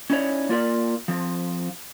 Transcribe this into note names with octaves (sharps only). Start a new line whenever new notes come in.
C#4 D#4 E4 G4 C#5 D5
A#3 F4 A#4 D5
F3 C4